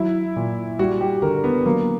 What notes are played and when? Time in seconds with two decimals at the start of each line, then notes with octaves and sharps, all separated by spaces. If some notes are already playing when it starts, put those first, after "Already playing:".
Already playing: F#3 E4
0.36 A#2
0.79 G3 F#4
1.01 G4
1.22 D3 A#4
1.44 B3
1.66 F#3 A#3